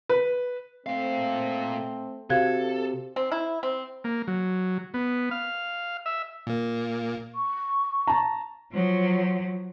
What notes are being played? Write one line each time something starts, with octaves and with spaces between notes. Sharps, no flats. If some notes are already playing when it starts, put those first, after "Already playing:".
B4
A#2 A3 C4 F5
C3 F#4 A4 F5 G#6
C4
E4
C4
A#3
F#3
B3
F5
E5
A#2 A#3
C#6
A5 A#5
F3 F#3